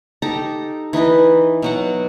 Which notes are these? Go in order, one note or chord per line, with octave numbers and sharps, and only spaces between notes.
D#4 G4 A4 A#5
E3 D#4 B4 D#5
B2 F#3 F#5